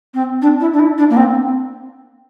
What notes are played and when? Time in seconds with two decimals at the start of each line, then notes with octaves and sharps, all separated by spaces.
0.14 C4
0.42 D4
0.60 E4
0.73 D4
0.79 E4
0.98 D4
1.10 A#3
1.17 C4